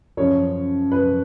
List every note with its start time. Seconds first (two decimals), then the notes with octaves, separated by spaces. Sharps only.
0.17 F#2 C#3 F3 C#5
0.91 F#2 C#3 F3 B4